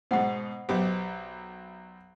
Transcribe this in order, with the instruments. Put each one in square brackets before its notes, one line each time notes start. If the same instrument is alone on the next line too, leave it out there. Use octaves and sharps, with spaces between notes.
[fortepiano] G#2 B2 [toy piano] C5 F#5
[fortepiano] B1 B3 G4 [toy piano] C5 C#5 D#5